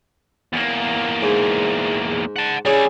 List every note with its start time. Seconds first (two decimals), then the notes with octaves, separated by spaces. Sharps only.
0.53 E2 A#3
1.22 G#2
2.36 F#5 A5
2.65 G3 C#4 E4 G#4